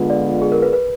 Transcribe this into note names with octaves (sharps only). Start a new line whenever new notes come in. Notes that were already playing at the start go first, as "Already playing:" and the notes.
Already playing: D3 G#3 B3 F4
D5
G#4
A#4
B4
B4